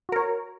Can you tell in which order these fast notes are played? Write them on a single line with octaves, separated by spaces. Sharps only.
F#4 A#4 C#5